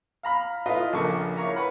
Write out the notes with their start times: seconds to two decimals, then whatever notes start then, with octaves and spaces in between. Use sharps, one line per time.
0.23 F5 A#5 B5 F6
0.66 E4 F4 A4 B4 D#5
0.93 A#1 C#3 A#3 D4 A4 C#6
1.37 E4 A#4 C#5 F5 A#5
1.56 B4 F#5 B5